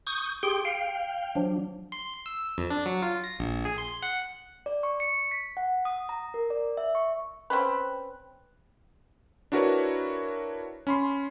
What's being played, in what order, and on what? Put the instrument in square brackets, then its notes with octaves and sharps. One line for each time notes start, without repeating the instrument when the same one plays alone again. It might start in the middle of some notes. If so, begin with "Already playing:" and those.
[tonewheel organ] C#6 D#6 G6
G4 G#4 G5 C6
F5 G5
F3 F#3 D4
[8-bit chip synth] C6
E6
F2
D4
F#3
F4
A#6
A#1
G#4
C6
F#5
[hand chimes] D5
C#6
C#7
B6
F#5
D#6
A#5
A#4
D5
E5
C#6
[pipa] C4 C#4 B4
[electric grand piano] D4 E4 F#4 A#4 B4 C#5
C#4 B5 C6